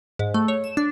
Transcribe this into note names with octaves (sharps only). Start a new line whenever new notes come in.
G#2
A3
C#5
E7
D4